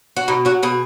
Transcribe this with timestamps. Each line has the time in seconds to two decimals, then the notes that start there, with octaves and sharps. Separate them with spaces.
0.16 F#4
0.28 B2 D#4
0.45 F#3 F#4
0.63 B2 G#4